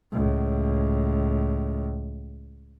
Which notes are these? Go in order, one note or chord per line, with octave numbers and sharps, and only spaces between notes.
C#2 A2